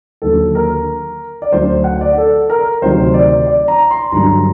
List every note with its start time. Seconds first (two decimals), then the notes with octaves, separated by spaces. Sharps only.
0.22 D#2 D3 F#3 A4
0.55 A#4
1.42 D5
1.52 D2 D3 F#3 C5
1.84 F#5
2.01 D5
2.18 A4
2.50 A#4
2.81 D2 C3 D#3 F#3 C5
3.14 D5
3.46 D5
3.68 A#5
3.91 C6
4.12 G2 D3 F#3 A#5